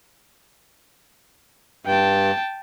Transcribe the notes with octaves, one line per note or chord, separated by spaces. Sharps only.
G2 G5 A5